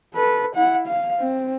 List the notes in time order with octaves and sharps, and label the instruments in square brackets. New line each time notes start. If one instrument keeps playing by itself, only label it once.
[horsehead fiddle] A4 B4
E4 F#5
F5
C4